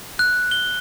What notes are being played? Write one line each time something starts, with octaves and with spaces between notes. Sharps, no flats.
F#6
G7